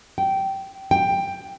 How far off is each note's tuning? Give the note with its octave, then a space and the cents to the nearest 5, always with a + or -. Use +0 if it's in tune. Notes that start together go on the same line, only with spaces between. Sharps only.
G5 -15
G5 +10